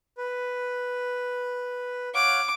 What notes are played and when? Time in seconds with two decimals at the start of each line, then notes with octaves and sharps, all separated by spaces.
0.17 B4
2.14 C#5 F5 F#5 D6